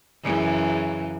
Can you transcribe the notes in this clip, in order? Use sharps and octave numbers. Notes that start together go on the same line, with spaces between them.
F#2 C#3 E3